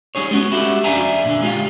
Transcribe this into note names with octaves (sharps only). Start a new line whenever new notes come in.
G3 D#4 G#4 C#5
G#3 B3 C#4 F#4
E4 F#4 G4 A4
F2 D4 E5 F5 G#5 A#5
A#2 D3
G#3 F4 G4 F5